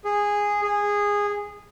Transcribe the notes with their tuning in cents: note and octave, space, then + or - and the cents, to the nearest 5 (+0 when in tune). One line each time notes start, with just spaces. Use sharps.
G#4 -10
G#4 -15